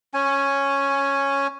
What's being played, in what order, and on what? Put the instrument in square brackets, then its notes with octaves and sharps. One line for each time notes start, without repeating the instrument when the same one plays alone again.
[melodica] C#4 G#5